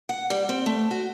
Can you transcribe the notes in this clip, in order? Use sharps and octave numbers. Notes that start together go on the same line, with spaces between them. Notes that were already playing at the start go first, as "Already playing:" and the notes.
F#5
G3
C4
A3
F#4